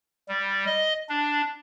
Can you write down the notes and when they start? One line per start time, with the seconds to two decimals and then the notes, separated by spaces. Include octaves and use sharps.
0.29 G3
0.66 D#5
1.09 D4